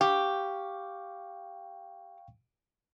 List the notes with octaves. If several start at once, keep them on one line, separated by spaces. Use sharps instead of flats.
G4 F5 G5 C#6